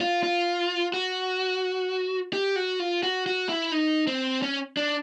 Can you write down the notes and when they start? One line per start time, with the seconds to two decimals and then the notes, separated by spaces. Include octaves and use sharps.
0.01 F4
0.23 F4
0.94 F#4
2.33 G4
2.56 F#4
2.79 F4
3.03 F#4
3.26 F#4
3.49 E4
3.72 D#4
4.07 C4
4.42 C#4
4.77 D4